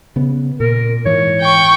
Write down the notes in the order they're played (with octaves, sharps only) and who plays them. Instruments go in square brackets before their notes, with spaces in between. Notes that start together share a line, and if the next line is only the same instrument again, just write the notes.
[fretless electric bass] C#3 B3
[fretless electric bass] A#2 [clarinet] A#4
[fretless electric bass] G#2 E3 [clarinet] C#5
[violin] G5 C#6